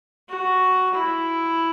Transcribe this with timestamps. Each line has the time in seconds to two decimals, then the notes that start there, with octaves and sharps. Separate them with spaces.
0.29 F#4
0.95 E4